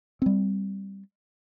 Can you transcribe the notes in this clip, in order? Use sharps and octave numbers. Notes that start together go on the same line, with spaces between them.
G3 C4